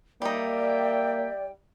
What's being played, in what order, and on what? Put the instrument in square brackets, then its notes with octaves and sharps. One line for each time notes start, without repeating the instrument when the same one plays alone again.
[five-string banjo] G3 D#4 [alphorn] A#3 [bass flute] D5 [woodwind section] E5 G5